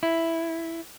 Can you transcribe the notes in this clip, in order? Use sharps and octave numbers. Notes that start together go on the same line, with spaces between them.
E4